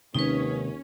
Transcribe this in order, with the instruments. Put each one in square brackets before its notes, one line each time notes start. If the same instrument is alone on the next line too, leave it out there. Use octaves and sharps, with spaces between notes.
[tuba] D#2 [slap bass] C3 D#3 G#3 [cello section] C#4 [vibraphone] D#4 B4